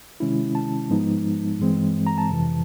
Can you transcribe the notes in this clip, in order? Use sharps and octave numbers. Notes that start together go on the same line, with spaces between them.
C3 D#3 G#3 C#4 E4
A5
G#2 F3 G#3 B3 D#4
G2 E3 G#3 C4
A#5
A5
F2 C3 E3